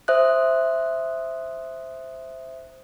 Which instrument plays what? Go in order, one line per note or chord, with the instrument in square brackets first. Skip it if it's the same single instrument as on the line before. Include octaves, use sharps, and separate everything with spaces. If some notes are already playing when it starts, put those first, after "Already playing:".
[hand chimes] C5 E5 D#6 F#6